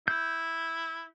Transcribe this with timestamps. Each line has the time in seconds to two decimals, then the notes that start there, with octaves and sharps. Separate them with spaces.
0.08 E4 G6